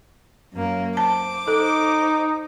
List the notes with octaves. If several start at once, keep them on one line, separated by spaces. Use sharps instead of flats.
F#2 A#3
C5 A5 D6
D#4 A4